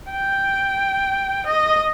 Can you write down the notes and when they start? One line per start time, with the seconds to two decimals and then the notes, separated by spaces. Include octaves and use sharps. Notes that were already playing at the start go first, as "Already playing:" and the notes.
0.11 G5
1.46 D#5